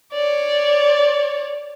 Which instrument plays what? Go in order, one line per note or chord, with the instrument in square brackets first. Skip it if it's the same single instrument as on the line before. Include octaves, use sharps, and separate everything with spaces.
[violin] C#5 D5